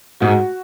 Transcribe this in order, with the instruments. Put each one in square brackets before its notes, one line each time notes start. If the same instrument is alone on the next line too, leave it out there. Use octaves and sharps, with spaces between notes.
[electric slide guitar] G#2 [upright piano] F#4